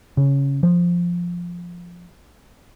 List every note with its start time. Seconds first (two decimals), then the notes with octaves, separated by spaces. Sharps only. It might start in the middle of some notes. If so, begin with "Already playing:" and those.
0.17 C#3
0.63 F3